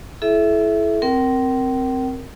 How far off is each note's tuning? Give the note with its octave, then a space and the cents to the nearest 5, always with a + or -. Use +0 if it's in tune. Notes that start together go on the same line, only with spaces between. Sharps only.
E4 +15 A4 -40 E5 +0
C4 +0 A#4 +0 G5 -40